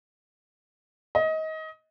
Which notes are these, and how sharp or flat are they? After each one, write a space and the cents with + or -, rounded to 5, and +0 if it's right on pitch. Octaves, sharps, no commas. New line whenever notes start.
D#5 +25